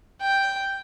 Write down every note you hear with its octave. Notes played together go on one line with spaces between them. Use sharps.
G5